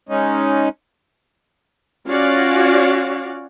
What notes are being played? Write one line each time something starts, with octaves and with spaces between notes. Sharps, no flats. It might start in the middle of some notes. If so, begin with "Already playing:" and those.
G#3 C#4 D#4
C#4 F4 F#4 C#5 D5 F5